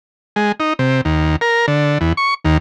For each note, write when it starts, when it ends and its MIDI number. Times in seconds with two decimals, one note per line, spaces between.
0.36 0.52 56
0.60 0.73 63
0.79 1.01 48
1.05 1.36 39
1.41 1.66 70
1.68 1.98 50
2.01 2.13 40
2.17 2.34 85
2.45 2.57 39